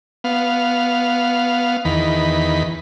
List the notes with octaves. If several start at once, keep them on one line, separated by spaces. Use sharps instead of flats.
B3 F5
E2 D#3 B5